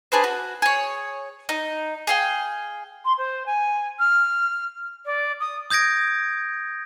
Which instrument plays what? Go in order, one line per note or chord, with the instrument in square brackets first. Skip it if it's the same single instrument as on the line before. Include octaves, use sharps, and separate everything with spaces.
[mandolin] D4 G#4 B4 C5
F#4
G#4 C#5
D#4
G#4 F5 G5
[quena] C6
C5
G#5
F6
D5
D#6
[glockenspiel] D#6 G6 G#6 A#6 D7